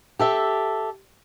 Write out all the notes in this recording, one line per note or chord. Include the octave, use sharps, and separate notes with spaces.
G4 A4 E5